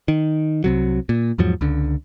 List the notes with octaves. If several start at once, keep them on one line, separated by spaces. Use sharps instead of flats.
D#3
C2 C3 F#3
A#2
E2 G#2 F3 F#3
C#2 D3